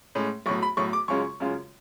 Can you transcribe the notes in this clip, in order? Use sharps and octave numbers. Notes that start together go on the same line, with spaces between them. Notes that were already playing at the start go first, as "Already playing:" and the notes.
A2 G#3 C#4
B1 A2 F#3 C#6
B5
B1 A2 F#3 C#6
D6
F#2 C#3 G#3 C#4 F4 C#6
F#2 C#3 G#3 C#4 F4